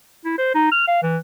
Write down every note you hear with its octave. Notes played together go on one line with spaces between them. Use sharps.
E4
C5
D#4
F6
F5
E3